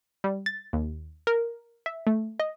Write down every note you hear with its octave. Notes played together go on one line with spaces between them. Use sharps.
G3
A6
D#2
A#4
E5
A3
D#5